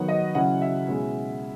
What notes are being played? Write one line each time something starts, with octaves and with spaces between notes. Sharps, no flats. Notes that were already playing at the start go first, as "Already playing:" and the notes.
Already playing: D#3 F#3 B3 F#5
D#5
C#3 F#3 C#4 E4 F#5
E5
B2 G#3 C#4 E4